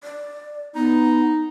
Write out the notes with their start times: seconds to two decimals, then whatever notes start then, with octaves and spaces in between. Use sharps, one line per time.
0.04 D5
0.75 B3 D#4